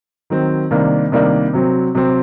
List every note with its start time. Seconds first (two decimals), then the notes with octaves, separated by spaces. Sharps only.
0.30 D#3 F#3 C4
0.71 C3 D#3 G3 A#3 D4
1.12 C3 D#3 G3 A#3 D4
1.53 C3 F#3 C4
1.95 C3 F#3 C4